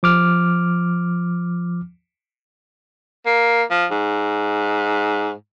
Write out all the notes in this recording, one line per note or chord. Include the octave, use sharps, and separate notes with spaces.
F3 D6 F6
A#3
F3
G#2